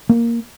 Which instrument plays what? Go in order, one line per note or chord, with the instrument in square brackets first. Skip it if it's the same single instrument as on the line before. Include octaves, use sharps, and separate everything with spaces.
[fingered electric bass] A#3